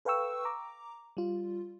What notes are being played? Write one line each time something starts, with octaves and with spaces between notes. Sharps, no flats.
A4 B4 F5 G5 C#6 E6
A#5 D6
G3 F4